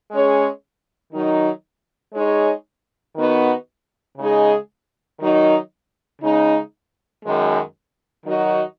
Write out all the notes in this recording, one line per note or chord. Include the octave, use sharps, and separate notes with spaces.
G#3 C#4 G#4 C#5
D#3 F#3 D#4
G#3 D#4 G#4 C#5
D#3 B3 D#4 F#4 B4
C#3 G#3 D#4 G#4 D#5
D#3 F#3 D#4
C#3 G#3 D#4
F#2 D#3 G#3
D#3 F#3 D#4 F#4 D#5